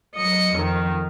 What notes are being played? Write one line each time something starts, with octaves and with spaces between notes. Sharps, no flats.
F#3 D#5 C#7
F2 D#3